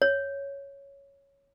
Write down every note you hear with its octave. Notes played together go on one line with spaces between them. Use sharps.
C#5